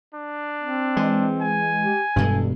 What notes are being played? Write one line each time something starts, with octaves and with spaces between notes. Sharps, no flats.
D4
C4
E3 G#3
G#5
G4
E1 G2 B2 G#3 A4